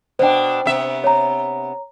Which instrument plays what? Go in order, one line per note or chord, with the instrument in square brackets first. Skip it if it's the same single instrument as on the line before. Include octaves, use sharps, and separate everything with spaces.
[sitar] B2 D4 [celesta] C5 G5
[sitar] C3 B3 E5
[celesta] C#5 A#5